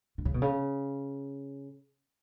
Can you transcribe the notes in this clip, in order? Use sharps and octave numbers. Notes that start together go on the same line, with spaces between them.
D3
C#3
B2
C#3